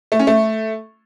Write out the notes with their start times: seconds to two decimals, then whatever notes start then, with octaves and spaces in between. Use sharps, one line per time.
0.12 A3
0.19 C#4
0.27 A3